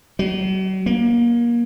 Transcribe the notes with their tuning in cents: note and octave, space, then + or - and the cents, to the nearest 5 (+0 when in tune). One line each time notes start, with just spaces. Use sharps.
F#3 +40
A#3 +25